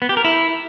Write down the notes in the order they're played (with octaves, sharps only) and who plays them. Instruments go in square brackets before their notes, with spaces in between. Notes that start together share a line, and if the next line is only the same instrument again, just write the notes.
[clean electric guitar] B3
G4
A#4
E4